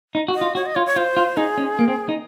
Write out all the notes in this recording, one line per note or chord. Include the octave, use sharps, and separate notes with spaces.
D#4
F#4
D#5
F4
F#4 C#5
D#5
F4 C#5
C#5
F4 C5
F4
D#4 G#4
C#4
A#3
C4
D#4